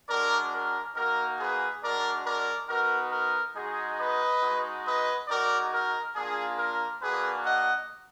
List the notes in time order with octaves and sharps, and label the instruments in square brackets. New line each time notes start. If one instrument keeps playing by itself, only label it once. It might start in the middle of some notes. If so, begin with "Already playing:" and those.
[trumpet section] G#3 D4 F#4 A#4 D5
A#4
A#3 D#4 F#4 A#4
G#4 B4
G#3 D4 F#4 A#4 D5
A#4 D5
B3 D#4 F#4 A#4
A#4
G#3 D#4 F#4 G#4
B4 D#5
G#3 D#4 F#4
B4 D#5
G#3 D#4 F#4 A#4 D5
A#4
A#3 D4 F4 G#4
A#4
A#3 D4 F#4 G#4 B4
D#5 F#5